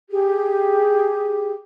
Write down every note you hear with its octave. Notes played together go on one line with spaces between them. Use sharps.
G4 G#4